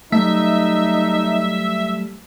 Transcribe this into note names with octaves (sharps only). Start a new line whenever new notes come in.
F#3 G3 A3 D#4 E5